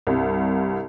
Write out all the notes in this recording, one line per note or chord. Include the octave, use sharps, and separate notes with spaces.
C2 G2